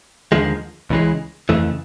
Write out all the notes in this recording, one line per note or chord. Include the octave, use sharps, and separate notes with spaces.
D#2 D3 F3 G#3
C#2 C#3 E3 G#3
F2 C#3 E3 A3